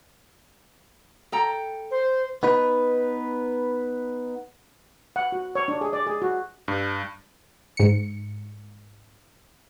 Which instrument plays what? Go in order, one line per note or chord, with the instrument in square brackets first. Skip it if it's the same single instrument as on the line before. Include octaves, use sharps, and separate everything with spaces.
[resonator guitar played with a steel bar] A4 G5 A#5
[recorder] C5
[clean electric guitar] B3 D#4 B4
[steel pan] F#5
F#4
C#5
D4
G#4
D5
G#4
F#4
[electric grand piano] G2
[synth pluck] G#2 C#7